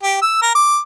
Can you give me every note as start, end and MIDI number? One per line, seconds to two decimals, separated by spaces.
0.03 0.18 67
0.22 0.38 88
0.42 0.50 70
0.55 0.78 86